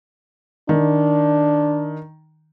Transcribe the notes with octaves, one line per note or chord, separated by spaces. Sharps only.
D#3 D4